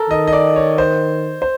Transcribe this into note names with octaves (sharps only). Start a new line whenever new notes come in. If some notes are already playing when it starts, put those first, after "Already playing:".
Already playing: A4 A#4
D#3 D#5
D#5
D5
C#5
C5
C5